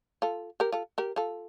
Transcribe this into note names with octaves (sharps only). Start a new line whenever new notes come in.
F4 A4
G4 A#4
F4 A4
G4 A#4
F4 A4